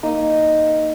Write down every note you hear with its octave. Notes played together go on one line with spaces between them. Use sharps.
A#3 D#4 D#5